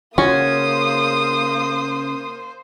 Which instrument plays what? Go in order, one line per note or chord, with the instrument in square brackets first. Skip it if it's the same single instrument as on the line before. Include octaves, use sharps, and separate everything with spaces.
[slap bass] C#3 [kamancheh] A#3 D#6 [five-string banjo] C#4 F#4 [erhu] C5